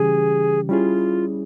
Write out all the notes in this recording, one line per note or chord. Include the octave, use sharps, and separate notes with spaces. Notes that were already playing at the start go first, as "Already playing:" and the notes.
Already playing: C#3 E3 G3 C#4 G4 G#4
G3 C#4 E4 F4 G#4